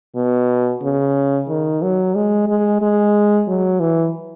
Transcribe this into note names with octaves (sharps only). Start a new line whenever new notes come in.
B2
C#3
D#3
F#3
G#3
G#3
G#3
F#3
E3